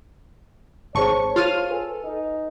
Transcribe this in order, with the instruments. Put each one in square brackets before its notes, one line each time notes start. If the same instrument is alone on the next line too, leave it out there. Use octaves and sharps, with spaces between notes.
[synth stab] G#1 C#6 [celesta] G#4 C5 A5 [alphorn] C#5
[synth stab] F4 F6 D#7
[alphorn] A4 [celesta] B4 G#5
[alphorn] D#4